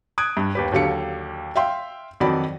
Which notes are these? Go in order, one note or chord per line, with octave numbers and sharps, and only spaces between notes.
D#6 F#6 G#6 D7
G2
D#2 G4 B4
D#2 D3 F#3 G4 F5 C#7
E5 F5 G5 C6
F2 D#3 F#3 F#4 D5 B5